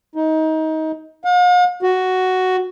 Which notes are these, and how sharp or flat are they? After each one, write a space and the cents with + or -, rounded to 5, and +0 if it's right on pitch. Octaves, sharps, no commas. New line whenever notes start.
D#4 +25
F5 +45
F#4 +5